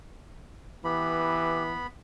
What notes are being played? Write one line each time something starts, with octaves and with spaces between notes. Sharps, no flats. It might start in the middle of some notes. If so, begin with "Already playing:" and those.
E3 B3 G4 B5